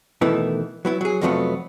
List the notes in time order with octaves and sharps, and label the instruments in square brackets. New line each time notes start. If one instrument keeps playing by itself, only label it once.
[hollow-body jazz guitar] B2 D#3 E3 A3 B3 E4
F#3 B3 E4
F#3 G#4
F2 C3 F3 F#3 A3 B3